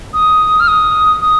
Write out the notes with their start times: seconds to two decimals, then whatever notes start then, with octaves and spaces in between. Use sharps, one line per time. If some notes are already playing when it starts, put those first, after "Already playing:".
0.14 D#6
0.60 F6
0.68 D#6
1.22 D#6